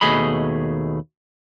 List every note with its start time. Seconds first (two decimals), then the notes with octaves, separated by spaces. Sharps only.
0.01 D#2 B2 A3 G#4 D#5 B5